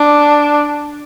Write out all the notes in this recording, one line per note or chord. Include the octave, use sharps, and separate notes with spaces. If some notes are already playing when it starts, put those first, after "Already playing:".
Already playing: D4